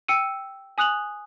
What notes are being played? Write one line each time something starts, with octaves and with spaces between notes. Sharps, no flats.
G5 E6 C#7 D#7
G#5 D#6 F#6 F7 F#7